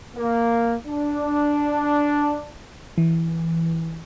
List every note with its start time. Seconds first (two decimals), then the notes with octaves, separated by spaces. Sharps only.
0.17 A#3
0.86 D4
2.98 E3